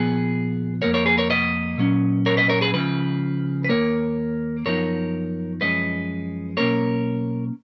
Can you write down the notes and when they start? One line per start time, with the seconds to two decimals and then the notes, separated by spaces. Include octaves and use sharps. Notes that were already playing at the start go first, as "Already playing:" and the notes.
Already playing: A#2 F3 B3 G#4 B4
0.82 F2 D#3 A#3 A#4 C#5
0.94 A#4 C#5
1.06 G#4 B4
1.18 A#4 C#5
1.30 B4 D#5
1.78 A#2 F#3 C#4
2.26 A#4 C#5
2.37 B4 D#5
2.49 A#4 C#5
2.61 G#4 B4
2.74 C#2 C#3 F3 B4
3.64 B4
3.69 D#2 D#3 A#3 A#4 C#5
4.66 F#2 F3 B3 D#4 A#4 C#5
5.61 F#2 F3 G#3 C#4 B4 D#5
6.57 B1 B2 A#3 C#4 A#4 C#5